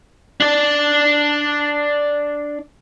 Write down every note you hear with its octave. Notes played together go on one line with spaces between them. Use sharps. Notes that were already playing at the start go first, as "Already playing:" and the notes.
D4 D5